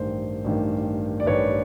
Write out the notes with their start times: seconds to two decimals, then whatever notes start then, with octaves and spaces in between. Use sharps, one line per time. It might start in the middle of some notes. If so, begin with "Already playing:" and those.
Already playing: A1 G2 D#3 C5
0.44 A1 G2 D#3
1.20 D5
1.26 A1 G2 D#3 B4 C#5